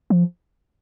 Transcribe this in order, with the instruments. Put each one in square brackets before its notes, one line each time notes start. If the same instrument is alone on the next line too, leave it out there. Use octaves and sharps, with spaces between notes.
[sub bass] F3